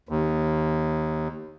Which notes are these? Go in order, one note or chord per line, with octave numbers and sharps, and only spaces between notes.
D#2